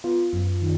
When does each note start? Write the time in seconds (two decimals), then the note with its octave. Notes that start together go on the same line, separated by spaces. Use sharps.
0.04 B3 F4
0.33 F#2
0.62 D#3